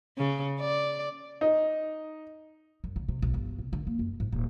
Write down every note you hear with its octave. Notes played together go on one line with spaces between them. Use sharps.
C#3
D5
D#4
F#2
C#3
C3
B1
G1
C3
D3
A#3
F#2
G#2
D#1